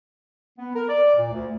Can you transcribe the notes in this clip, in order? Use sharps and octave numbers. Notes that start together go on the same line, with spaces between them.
B3
A#4
D5
A#2
D2